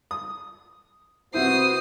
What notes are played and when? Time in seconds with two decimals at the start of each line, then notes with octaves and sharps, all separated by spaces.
0.11 D#6
1.34 C3 B3 E4 F#4 C5 D#6 C7